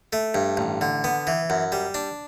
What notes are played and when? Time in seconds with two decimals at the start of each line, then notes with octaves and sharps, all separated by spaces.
0.13 A3
0.34 G2
0.57 A1
0.81 D3
1.04 B3
1.27 E3
1.50 F#2
1.72 G3
1.94 D4